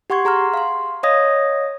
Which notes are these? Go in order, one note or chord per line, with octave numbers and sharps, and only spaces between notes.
G4 F#5 C6 C#6 G#6
G#4 A#5 C6 F6
F5 C6
C#5 D#5 F5 D#6 G#6 A#6